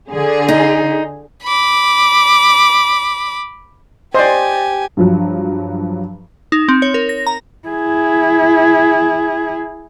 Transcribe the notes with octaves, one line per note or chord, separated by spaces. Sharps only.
D3 G#4
D#4
B5 D6
G4 C5 D5 D#5 G#5
G2 F3 F#3
D#4
C4
C#5
A#4
A#6
A#5
E4 G#4